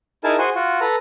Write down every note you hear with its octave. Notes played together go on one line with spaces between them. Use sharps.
D#4 E4 G#4 A#4 G#5 A5
F#4 G#4 C5
F4 F#4
A4 B4 A#5